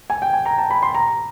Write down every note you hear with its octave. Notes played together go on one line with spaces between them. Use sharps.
G#5
G5
G#5
A#5
A5
B5
C6
A#5